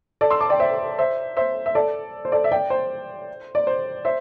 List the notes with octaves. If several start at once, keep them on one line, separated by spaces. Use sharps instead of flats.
A4 D5
C6 E6
A5 D6
D5 G5
C5 E5
C5 E5
C5 E5
E5
A4 D5
C5
A4 D5
E5
D5 G5
C5
D5
C5
C5 E5